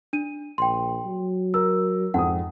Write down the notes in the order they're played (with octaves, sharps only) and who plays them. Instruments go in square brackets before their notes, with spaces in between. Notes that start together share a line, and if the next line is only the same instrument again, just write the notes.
[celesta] D4 D#7
[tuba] A#1 [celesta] G5 C6
[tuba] F#3
[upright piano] A#4 [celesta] E6
[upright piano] F2 D#6 [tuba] G#2 [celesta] F#5